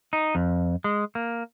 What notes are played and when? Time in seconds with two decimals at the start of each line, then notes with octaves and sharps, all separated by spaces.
0.13 D#4
0.35 F2
0.84 G#3
1.15 A#3